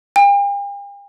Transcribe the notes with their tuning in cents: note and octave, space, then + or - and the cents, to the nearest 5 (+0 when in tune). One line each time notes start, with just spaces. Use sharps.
G5 +45